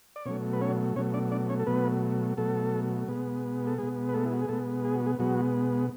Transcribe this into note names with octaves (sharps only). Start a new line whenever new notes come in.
D5
B2 F#3 A3 C#4 C#5
B4
C#4 C#5
B2 F#3 A3 C#4 C#5
D4 D5
D4 D5
C#4 C#5
A4
B2 F#3 A3 B3 B4
B2 F#3 A3 A4
B2 G#3 B3
A4
B2 G#3 B3 G#4
B4
A3 A4
E4
F#4
G#4
B2 G#3 A3 B3 A4
G#4
F#4
G#3 G#4
B2 F#3 G#3 B3 F#4